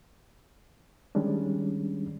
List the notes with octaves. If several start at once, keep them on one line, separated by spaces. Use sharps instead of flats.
D#3 G3 G#3 C#4 D4